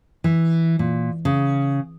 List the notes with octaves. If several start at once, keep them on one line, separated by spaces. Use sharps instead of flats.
E3
A#2
C#3